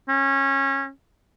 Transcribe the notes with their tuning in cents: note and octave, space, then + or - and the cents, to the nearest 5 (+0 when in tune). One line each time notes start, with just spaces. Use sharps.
C#4 -20